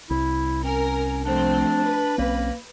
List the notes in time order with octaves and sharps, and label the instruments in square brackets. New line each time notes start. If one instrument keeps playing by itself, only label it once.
[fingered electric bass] C2 [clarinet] E4
[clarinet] C#4 [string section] A#4
[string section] F3 A3 C4 [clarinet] D4
[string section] B4
[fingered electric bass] B1 C4 C#4 [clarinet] A#3